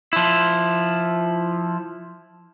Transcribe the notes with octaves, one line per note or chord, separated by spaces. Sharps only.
F3 E4